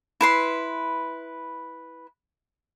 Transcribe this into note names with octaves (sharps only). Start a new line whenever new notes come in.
E4 B4 C6